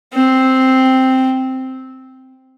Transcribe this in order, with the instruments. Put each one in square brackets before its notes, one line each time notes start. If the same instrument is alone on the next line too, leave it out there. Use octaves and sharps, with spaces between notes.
[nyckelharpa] C4